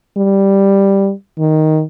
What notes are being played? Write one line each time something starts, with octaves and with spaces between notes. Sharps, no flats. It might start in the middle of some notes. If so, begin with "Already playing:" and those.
G3
D#3